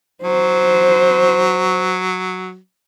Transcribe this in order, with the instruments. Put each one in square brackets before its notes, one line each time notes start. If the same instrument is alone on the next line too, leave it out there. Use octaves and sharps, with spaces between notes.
[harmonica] F#3 [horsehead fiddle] C5